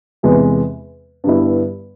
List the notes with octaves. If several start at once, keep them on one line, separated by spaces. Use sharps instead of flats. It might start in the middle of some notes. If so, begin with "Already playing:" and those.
E2 C3 E3 G#3 B3
G2 D3 G3 B3 E4